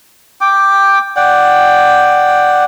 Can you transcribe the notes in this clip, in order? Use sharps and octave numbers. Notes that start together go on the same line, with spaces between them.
G5 D6
D5 F#5 G5